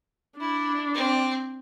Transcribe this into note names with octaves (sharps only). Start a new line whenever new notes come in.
D4 E4
C4